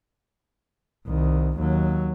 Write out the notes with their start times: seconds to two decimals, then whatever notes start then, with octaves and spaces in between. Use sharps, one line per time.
1.07 C2 D#3
1.58 D#2 F#3